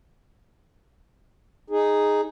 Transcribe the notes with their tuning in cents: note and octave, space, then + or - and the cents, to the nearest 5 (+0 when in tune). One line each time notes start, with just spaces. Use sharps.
D#4 -5 G#4 +0